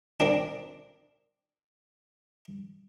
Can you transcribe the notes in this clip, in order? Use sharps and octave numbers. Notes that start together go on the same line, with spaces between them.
A#3 C4 D4